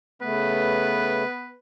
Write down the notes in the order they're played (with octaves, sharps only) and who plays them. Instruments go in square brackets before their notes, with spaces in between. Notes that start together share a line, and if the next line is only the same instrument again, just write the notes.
[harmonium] C#3 A3 [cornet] B3 [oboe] B4